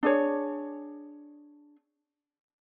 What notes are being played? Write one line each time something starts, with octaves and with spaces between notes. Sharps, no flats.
D4 G#4 C#5